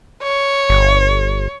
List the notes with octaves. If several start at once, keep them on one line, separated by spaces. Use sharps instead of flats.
C#5
G1